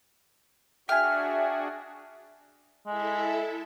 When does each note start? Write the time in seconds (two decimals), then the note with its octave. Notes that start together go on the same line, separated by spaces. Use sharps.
0.89 D4 F#4 G#4 E5 G5 G#5 F6
2.86 G#3 E4 A4 E5